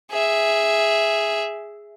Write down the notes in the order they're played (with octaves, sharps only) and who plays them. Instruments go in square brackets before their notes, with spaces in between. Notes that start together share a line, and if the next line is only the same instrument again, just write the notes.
[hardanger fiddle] G#4 E5